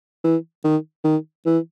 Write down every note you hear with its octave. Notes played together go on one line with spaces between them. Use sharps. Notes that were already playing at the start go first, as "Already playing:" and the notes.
E3
D#3
D#3
E3